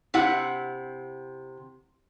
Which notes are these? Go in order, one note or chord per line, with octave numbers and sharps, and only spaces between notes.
C3 E4 F#5